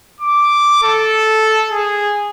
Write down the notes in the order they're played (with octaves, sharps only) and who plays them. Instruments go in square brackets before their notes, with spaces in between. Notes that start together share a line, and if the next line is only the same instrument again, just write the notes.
[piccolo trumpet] D6
A4
G#4